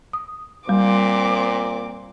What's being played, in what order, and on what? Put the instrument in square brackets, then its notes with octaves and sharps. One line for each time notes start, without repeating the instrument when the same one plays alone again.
[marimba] D#6
[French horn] A#2 [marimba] G3 [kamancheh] C4 D6